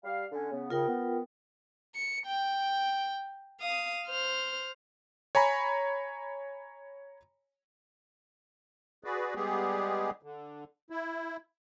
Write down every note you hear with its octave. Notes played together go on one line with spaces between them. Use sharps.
G3 F5
D3 C#4
C#3 B3
D#2 C#3 F4 A#4 G5
B3
C#7
G5
F5 D#6
C5 F6
C#5 G#5 A#5 B5
F#4 G#4 B4 D5
G3 G#3 B3 G4 G#4
D3
E4